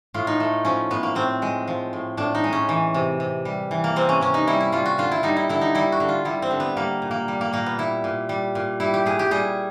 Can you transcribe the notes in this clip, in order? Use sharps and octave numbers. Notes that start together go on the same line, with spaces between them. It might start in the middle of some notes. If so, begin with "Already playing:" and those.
A2 F4
D#4
A3
F3 C#4
A2 B3
A#3
A2 C4
G#3
F3
A2
A2 D4
D#4
G#3
C#4
E3
C3
C3
G3
E3
A#3
C3 C4
C#4
C3 C#4
D#4
G3 E4
E4
G3 F4
F#4
D3 F4
E4
G3 D#4
E4
D3 E4
D#4
G3 E4
F#4
D3
F4
G3 E4
C4
D3
B3
G3 A#3
A#2
A#3
G3
A#3
A#2 A#3
B3
G3 E4
A#2
G3
A#2
G3 E4
G4
A#2 G#4
G4
G3 G#4